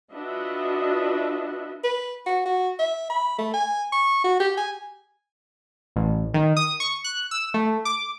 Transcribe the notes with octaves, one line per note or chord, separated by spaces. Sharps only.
D4 F4 F#4 B4 D#5 E5
B4
F#4
F#4
E5
B5
A3
G#5
C#6
F#4
G4
G#5
A1
D#3
D#6
C#6
F#6
E6
A3
D6